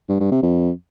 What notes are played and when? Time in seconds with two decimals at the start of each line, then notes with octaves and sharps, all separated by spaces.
0.09 G2
0.20 G2
0.31 C3
0.43 F2